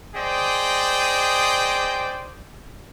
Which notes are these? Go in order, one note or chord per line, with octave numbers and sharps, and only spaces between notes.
G#4 C5 D5 D#5 G5